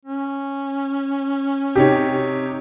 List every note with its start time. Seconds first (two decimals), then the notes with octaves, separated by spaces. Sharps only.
0.05 C#4
1.76 C3 D#4 G4 C#5